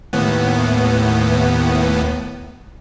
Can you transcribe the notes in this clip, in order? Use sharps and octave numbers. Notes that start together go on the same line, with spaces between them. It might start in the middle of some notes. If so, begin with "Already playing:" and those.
D#2 A2 B3